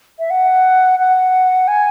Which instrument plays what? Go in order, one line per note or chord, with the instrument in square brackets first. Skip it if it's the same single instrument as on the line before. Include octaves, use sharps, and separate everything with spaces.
[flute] E5
F#5
F#5
G#5